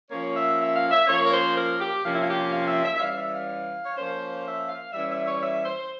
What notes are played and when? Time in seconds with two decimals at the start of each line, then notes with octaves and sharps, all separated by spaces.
0.10 F3 A#3 C#4 C#5
0.35 E5
0.60 E5
0.75 F5
0.91 E5
1.07 F3 A#3 C#4 C#5
1.24 A#4
1.31 C5
1.55 A#4
1.80 G4
2.03 C3 F3 A#3 C#4 F4
2.13 E4
2.21 F4
2.28 G4
2.52 F5
2.67 E5
2.84 E5
2.95 E5
3.00 E3 G3 C#4 F5
3.16 E5
3.32 F5
3.84 C#5
3.96 F3 A#3 C#4 C5
4.44 E5
4.68 F5
4.92 E3 G3 C#4 E5
5.08 E5
5.25 C#5
5.41 E5
5.65 C5